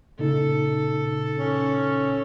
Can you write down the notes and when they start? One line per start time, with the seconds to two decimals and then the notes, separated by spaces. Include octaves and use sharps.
0.19 A#2 C#3 D#4 A4
1.38 C#4